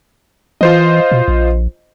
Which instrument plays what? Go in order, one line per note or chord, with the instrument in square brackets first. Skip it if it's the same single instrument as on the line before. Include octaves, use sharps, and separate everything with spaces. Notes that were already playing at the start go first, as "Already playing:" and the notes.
[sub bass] E3 [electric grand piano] F4 C5 D#5
[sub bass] B2
A#1